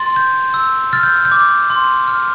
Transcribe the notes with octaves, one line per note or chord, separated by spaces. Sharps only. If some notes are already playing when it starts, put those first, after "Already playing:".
Already playing: C6 A6
G6
E6
F6 A6
G6
G6
D6
C6
F6